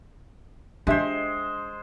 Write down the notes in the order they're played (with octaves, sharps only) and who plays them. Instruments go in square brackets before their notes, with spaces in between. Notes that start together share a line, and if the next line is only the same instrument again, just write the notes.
[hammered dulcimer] G#3 C5 [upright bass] D4 [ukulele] G4 E5